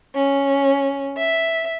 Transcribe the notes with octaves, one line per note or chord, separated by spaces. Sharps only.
C#4
E5